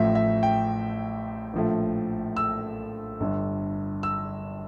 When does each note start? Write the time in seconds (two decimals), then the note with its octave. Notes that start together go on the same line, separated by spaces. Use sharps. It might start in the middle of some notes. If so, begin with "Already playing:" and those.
Already playing: A1 A2 F3 E5
0.15 E5
0.43 G5
1.53 A#1 A2 F3 A3
2.37 E6
3.20 G1 G2 D3
4.03 E6